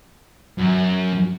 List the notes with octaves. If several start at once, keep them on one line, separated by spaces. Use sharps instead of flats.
F#2